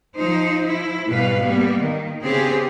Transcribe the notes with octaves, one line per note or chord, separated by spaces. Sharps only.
F3 D#4 C5
F3 E4
G#2 B2 G3 B4 F5
G3 A#3 B3
D#3
C#3 B3 C4 G4 G#4